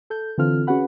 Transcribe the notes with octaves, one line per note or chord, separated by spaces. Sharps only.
A4 G6
D3 E3 C4 F4 A4 F6
C#4 F#4 G#4 B4 F#5 B5